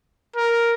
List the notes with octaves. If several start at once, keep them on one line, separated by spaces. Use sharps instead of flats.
A#4